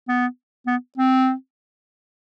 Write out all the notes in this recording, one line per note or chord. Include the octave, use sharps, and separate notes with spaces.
B3
B3
C4